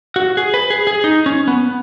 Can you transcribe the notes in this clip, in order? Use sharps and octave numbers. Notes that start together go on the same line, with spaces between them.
F#4
G#4
B4
G#4
G#4
D#4
C#4
B3